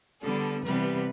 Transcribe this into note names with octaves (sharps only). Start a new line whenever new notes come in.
D3 G3 B3 D4 A4
C3 E3 G3 B3 B4